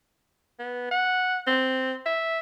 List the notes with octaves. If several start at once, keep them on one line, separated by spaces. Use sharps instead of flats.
B3
F#5
C4
E5